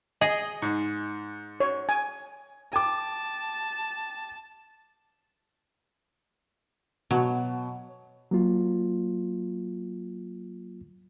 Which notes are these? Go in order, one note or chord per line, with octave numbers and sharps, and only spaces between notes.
G#4 D#5
G#2
C#5
G#5
G5 A5 D6
B2 F#3
F#3 A#3 F4